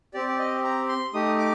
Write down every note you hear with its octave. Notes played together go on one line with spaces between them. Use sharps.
C4 G4 D5
D5
D#5
A#5
C6
A3 D#4 G4 D#6
D6